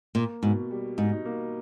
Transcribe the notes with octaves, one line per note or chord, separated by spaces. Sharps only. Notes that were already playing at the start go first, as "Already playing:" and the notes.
A#2 A#3
G#2 B2
G3
G#2 D#4
A#3